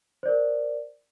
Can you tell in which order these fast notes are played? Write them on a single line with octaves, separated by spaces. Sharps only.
C5 D5 A#4